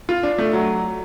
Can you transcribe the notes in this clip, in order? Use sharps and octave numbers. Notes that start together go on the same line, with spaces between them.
F4
D4
A3
F#3